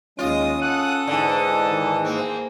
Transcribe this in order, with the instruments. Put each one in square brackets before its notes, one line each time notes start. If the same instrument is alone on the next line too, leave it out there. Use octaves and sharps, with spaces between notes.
[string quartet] D#2 D#6 [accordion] G#3 [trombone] C#4 [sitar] F4
[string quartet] A4 D#6 [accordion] F#5 F#6
[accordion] G#2 E3 [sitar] D3
[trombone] D#3
[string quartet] A#3 G#4 [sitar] C4